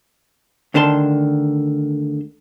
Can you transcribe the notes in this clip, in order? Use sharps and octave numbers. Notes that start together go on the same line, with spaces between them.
D2 D3 D#3 A5 C6